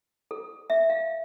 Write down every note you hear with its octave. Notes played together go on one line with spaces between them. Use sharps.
A4
E5
F5